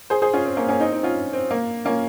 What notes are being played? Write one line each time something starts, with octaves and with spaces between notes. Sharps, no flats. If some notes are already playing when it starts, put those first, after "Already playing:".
G#4 C5
G#4 C5
C#4 F4
C4
A#3 C#4
A#3 C#4
C4 D#4
C4 D#4
C#4 F4
C4
A#3
A#3 C#4